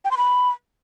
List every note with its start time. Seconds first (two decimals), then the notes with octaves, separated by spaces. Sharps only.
0.05 G5
0.11 C6
0.17 B5